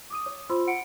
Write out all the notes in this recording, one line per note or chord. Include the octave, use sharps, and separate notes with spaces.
D6 D#6 D#7
C#5
F4 C5 B5 C6 E6
F#5 C#7 D7